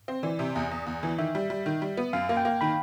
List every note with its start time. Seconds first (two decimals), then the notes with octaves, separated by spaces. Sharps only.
0.08 C4
0.23 E3 D5
0.39 C3
0.56 E2
0.71 E2
0.86 E2
1.03 E3
1.18 D#3 E5
1.35 G3
1.50 G3
1.66 D#3
1.82 G3
1.97 B3
2.13 F#2 F5
2.29 A#3
2.37 G5
2.45 A#3
2.61 D#3 B5